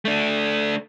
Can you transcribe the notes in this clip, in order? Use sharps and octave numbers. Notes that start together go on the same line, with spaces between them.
A3 D4